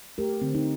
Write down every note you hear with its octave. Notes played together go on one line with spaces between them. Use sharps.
A3 G4 A#4
D3 C4
D#4